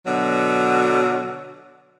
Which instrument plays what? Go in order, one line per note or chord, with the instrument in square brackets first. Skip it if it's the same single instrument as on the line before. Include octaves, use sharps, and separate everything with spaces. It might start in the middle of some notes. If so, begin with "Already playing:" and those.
[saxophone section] B2 D3 F#3